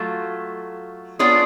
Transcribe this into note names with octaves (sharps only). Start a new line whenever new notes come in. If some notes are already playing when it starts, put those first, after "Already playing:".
Already playing: F#3 A3 F4
B3 D4 F4 G#4 C#5